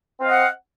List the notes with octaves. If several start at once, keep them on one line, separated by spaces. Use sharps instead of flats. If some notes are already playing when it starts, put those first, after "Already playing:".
C4 D#5 F5 F#5